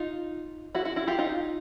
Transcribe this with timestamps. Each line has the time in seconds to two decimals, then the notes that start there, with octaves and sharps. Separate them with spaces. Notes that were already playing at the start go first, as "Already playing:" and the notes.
Already playing: D#4 F4
0.75 E4 F#4
0.85 E4 F#4
0.96 E4 F#4
1.08 F4 G4
1.18 D#4 F4